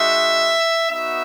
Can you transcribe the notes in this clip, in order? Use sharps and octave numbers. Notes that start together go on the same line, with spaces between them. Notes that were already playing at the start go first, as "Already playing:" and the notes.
Already playing: G#3 D#4 F#4 E5
B3 D#4 F#4 E5